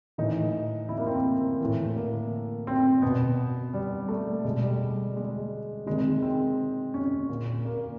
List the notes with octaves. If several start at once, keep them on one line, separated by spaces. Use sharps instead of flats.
A2 E3 D#4
E4
A#3
C4
A#3
A2 E3
A#3
C4
B2 B3
G3
A3
B2 G#3
G3
G#3
C3 D#3 G#3
C4
C#4
A#2
A#3